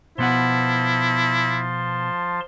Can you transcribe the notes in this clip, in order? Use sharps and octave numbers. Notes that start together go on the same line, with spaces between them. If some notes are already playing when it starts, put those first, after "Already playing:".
B2 F3 B3 E4 F#5 A5 C6